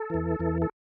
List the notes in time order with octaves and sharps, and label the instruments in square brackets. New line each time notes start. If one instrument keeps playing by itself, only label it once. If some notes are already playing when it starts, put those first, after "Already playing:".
Already playing: [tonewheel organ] A4
E2 E3
E2 E3
A4